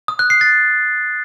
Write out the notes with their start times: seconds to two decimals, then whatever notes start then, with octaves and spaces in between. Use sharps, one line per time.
0.08 D#6
0.19 F#6
0.30 C7
0.41 A6